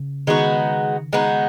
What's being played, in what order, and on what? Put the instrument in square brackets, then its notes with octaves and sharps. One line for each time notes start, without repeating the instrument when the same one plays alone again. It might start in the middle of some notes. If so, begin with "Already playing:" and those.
Already playing: [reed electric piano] C#3
[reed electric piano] D#3 [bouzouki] G#3 B3 D#4 F#4
[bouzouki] G#3 B3 D#4 F#4